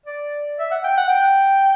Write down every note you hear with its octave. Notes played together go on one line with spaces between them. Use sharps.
D5
E5
F#5
G5
F#5
G5